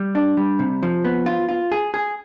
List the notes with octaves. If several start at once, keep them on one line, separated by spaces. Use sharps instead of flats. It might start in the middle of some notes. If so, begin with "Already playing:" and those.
Already playing: G3
D4
G3
C3
F3
B3
F4
F4
G#4
G#4